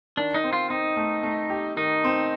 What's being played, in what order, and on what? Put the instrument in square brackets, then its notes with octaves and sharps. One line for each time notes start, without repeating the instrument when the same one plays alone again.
[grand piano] D#3 [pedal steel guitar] D4
[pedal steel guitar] D#4
[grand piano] C4
[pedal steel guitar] F4
[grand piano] C4 [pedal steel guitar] D#4
[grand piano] A3
A3
G4
[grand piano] D#3 [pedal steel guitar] D#4
[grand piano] C4